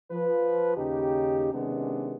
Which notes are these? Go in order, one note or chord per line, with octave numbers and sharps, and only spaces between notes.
F3 B4
D#2 C#3 D#4 G4
C3 D#3 G#3 B3 C#4 D4